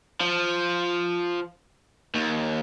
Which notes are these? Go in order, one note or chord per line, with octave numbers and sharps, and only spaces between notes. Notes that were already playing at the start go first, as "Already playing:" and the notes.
F3
D#2